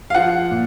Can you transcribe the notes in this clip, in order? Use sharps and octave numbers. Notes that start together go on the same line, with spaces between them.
F5
F3 F#5
A#2